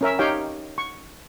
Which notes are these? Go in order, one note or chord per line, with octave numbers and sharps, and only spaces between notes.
C#4 A#4 E5
D#4 G4 C#5 F5 G5
C#6